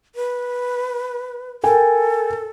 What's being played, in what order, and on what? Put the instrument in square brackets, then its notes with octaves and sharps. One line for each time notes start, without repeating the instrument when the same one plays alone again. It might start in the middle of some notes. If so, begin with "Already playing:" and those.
[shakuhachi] B4
[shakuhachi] A4 [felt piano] A#4 G5 G#5